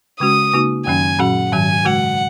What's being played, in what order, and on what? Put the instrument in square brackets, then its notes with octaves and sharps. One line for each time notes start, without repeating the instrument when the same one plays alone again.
[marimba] C#3 G#3 C#4 F#4 [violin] D#6
[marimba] C#3 A#3 D#4 F#4
[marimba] F#2 D#3 F#3 C#4 [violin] G#5
[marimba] A#2 F#3 C#4 F#4 [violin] F#5
[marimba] G#2 D#3 F#3 [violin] G#5
[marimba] C#3 G#3 F#4 [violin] F#5